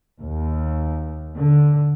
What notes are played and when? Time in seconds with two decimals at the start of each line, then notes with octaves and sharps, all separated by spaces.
0.21 D#2
1.36 D3